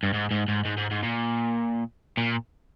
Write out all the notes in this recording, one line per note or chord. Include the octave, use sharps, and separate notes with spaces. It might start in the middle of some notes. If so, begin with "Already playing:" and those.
G2
G#2
G#2
G#2
G#2
G#2
G#2
A#2
A#2